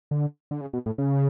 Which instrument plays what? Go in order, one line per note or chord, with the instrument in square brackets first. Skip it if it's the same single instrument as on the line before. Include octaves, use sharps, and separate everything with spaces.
[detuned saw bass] D3
D3
C#3
B2
A2
C#3